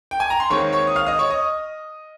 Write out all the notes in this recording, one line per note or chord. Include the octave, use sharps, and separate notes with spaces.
G5
G#5
A#5
C6
D#2 D#3 G#3 C4 C#5 C#6
C#5 C#6
D#6
F5 F6
D#5 D#6
C#5 C#6
D#5 D#6